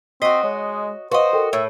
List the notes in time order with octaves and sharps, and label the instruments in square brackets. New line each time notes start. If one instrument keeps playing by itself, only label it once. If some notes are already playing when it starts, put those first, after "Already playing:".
[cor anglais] C4 [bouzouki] F#4 D#5 [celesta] B6 C7
[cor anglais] G#3 [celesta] C#5
[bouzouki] F#4 D#5 [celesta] B4 F5 C6 [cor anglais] C5
[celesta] A4 A#4 G5
[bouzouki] A2 [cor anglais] E5